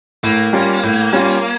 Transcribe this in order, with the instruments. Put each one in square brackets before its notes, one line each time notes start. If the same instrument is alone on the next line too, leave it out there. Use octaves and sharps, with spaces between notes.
[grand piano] A2 [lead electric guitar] A#3
[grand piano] G3 C#4 F4
A2
G3 C#4 F4